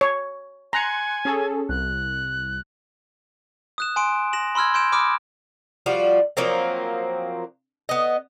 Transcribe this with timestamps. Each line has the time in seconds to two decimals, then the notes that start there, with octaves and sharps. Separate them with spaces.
0.01 C#5
0.73 G#5 A#5 C6 F#6 C#7
1.25 C#4 G#4 A4
1.69 C2 F#6
3.78 D#6 F#6 E7
3.96 G#5 C6 D7
4.33 A#6 E7 F#7
4.55 B5 C6 E6 F6 G#6
4.74 C6 G6 D7 E7
4.92 B5 D6 D#6 F6 D7
5.86 F3 G3 F4 F#4
6.37 F3 F#3 A#3 C4
7.89 B3 D#5